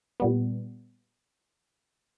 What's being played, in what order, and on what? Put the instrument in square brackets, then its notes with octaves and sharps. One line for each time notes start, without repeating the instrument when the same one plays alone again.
[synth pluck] A#2 G3 B3